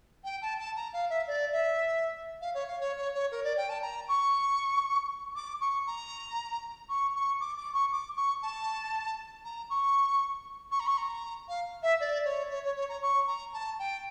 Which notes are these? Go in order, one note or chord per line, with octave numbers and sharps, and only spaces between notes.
G5
A5
A5
A#5
F5
E5
D5
E5
F5
C#5
F5
C#5
C#5
C#5
A#4
D5
G5
A5
A#5
C#6
D6
C#6
A#5
C#6
C#6
D6
D6
C#6
D6
C#6
A5
A#5
C#6
C#6
A#5
C#6
A#5
F5
E5
D5
C#5
C#5
C#5
C#5
A#5
C#6
A#5
A5
G5